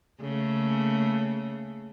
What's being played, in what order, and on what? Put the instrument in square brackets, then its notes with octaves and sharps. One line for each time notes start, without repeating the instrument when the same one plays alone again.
[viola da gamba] C#3 A3 A#3